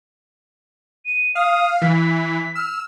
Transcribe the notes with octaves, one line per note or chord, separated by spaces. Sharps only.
D#7
F5 D#6
E3 B6
E6 F6